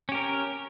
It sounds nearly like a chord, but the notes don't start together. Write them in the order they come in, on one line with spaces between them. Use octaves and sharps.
C#4 G4 A#4